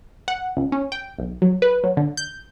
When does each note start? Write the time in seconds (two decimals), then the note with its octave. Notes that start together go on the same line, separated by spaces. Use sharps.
0.28 F#5
0.57 C#2
0.72 C#4
0.92 G5
1.19 B1
1.42 F#3
1.62 B4
1.84 F#3
1.97 D3
2.17 G6